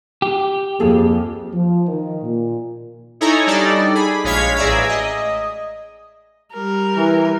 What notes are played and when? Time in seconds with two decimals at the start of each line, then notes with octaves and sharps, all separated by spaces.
0.22 G4
0.80 F2 A#3 G#4 A4
1.53 F3
1.87 D#3
2.23 A#2
3.21 D#4 E4 A4 C#5 G#5 A#5
3.47 G3 D4 D#4 A4 D5
3.95 G#4 B5
4.24 A#1 G#3 C#5 F5 G#6 B6
4.57 A1 G#4 D5 E5 A#5 G#6
4.89 D#5
6.54 G3 A#4
6.96 E3